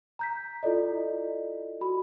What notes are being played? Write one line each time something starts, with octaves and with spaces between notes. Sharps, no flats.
A#5 G6 B6
E4 F4 A4 D5 D#5
F#4 B5